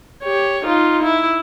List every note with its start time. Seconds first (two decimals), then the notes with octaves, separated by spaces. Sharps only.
0.23 G4 C#5
0.64 D#4 F4
1.03 E4